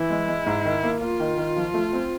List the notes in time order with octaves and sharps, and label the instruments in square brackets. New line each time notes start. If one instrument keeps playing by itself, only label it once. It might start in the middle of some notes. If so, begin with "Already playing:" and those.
Already playing: [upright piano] E3 [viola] E4
[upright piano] G#3
G#3
G#2
D#3
A#3
[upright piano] A#3 [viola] F4
[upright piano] D#3
D#3
F3
A3
C4